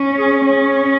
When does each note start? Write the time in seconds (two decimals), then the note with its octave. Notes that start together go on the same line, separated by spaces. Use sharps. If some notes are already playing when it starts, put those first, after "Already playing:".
Already playing: C#4
0.18 G#4
0.46 C#4